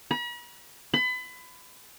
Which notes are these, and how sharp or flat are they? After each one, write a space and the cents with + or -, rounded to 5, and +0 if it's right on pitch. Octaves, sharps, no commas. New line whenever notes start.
B5 -45
B5 +30